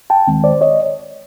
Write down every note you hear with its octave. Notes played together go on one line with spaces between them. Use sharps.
G5 A5
D#2 D#3 G#3 C4
C5 D5
C#5 D#5